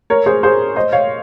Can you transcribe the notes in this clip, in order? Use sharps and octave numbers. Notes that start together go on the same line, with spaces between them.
A#4 C#5
G#4 C5
G#4 C5
C5 D#5
C#5 F5